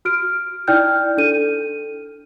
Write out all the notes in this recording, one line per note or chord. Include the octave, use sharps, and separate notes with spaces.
F#4 F6 D7
D#4 E4 D5 G5 F6 G6
D4 A4 D#7